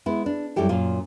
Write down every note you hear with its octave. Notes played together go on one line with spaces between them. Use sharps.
G#3 B3 E4
D4
F#2 G3 E4 G4 A4
F#2 A#2 F4